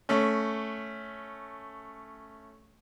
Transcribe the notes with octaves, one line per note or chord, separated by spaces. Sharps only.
A3 C#4